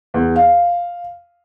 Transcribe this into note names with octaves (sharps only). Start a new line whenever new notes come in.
E2
F5